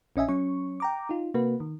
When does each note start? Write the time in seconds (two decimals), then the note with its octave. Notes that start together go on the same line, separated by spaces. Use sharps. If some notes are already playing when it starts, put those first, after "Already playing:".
0.16 A#1 C#4 D#5 E5 G#5
0.29 F#3 C#4 C#6
0.80 G5 A#5 D6
1.09 D#4 F4
1.34 C3 A#3 F#4 B4
1.60 D#3